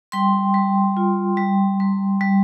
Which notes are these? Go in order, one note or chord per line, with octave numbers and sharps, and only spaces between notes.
G3 G5 C6
G3
F4
G3
G3
G3